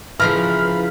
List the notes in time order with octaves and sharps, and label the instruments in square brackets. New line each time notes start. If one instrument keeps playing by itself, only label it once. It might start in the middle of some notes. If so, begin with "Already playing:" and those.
[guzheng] C#3 F3 A#5 [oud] E3 [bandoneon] F5 B5 [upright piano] F6